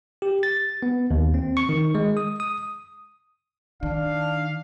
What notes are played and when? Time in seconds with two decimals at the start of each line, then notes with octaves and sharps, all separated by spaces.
0.22 G4
0.43 A6
0.83 B3
1.11 D#2
1.34 C4
1.57 C#6
1.69 D#3
1.95 G#3
2.17 D#6
2.40 D#6
3.83 D#3 D4 F5